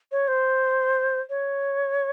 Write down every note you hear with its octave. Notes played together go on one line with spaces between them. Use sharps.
C#5
C5
C#5